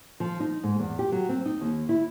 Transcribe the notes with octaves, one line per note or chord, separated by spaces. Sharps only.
F3
D#4
G#2
E2
G4
F#3
C4
D#4
D#2
E4